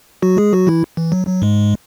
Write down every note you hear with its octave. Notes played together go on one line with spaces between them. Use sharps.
F#3 F#4
G#3 G#4
F#3 F#4
E3 E4
E3
F#3
F#3
G#2 G#3